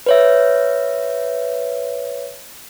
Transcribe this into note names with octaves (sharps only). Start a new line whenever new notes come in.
B4 C#5 E5